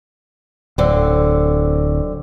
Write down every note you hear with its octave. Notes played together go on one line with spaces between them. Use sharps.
D1 D3 C4